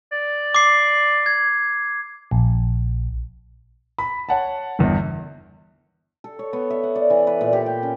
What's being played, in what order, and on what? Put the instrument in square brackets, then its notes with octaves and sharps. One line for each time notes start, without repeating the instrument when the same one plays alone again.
[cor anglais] D5
[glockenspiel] D6 C7
G#6
[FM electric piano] A#1
[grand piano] B5
C#5 F#5 A5
G1 E2
[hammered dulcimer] A4
C#5
B3
E5
F#5
D5
E3
B4
A#2
G4
G5
C#4